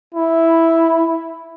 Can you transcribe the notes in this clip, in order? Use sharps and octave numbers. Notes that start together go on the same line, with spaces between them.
E4